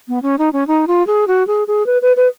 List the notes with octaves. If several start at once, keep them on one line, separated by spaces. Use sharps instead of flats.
B3
C#4
D#4
C#4
D#4
F4
G#4
F#4
G#4
G#4
B4
B4
B4